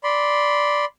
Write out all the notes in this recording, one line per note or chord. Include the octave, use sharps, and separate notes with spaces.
D5 B5 C6